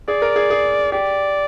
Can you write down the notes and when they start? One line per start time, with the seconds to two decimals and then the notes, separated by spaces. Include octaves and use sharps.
0.08 G#4 D5
0.22 A#4
0.36 G#4
0.50 G#4
0.92 G4 D5